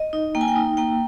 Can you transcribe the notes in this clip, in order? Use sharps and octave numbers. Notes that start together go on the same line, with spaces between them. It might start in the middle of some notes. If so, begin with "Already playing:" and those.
Already playing: D#5
D#4
A#3 G5
G#5
G5
D#4
A#3 G5